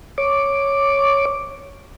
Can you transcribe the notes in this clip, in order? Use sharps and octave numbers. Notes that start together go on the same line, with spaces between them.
C#5 D6